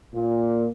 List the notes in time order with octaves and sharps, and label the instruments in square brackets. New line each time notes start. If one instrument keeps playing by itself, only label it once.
[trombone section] A#2